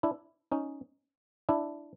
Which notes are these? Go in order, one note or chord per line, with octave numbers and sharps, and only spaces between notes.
D4 E4
C#4 D#4
D4 E4